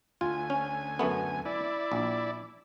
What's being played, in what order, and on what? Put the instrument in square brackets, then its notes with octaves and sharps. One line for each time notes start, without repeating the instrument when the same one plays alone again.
[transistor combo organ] D2 G#5 [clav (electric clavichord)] F4
[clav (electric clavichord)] C#4
F#2 A3 B3
[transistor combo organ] E4 D5
[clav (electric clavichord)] A#1